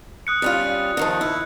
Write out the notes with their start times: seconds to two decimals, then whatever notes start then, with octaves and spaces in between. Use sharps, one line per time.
0.27 D#6 F#6 C#7
0.42 G3 C#4 F4
0.97 D3 D#3 F3
1.21 E4